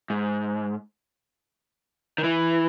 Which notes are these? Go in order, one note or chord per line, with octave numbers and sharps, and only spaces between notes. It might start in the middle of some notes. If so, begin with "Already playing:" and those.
G#2
D#3
E3